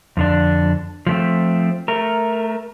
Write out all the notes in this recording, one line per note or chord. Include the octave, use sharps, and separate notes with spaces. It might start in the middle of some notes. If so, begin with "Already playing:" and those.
F2 D3 D4
F3 A3 C4
A3 A#4